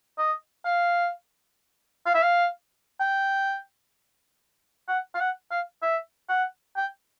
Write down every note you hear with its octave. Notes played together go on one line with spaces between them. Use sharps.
D#5
F5
F5
E5
F5
G5
F#5
F5
F#5
F5
E5
F#5
G5